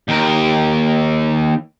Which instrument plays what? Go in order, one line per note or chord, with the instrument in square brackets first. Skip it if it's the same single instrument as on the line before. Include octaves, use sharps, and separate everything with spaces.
[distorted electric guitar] D#2 A#4